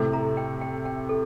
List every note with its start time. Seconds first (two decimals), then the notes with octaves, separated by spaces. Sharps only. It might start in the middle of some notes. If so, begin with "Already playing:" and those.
Already playing: A2 C3 A4
0.13 A#5
0.37 G5
0.61 G5
0.85 G5
1.09 A4